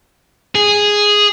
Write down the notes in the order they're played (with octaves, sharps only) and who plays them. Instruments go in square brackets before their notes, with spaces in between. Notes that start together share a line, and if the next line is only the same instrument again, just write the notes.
[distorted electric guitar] G#4